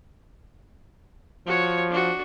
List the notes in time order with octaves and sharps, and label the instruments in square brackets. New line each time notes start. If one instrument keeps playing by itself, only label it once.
[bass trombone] F3 [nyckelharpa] F#4 C#5
[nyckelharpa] D4 F#4